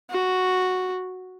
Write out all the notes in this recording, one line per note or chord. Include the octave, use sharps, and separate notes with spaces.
F#4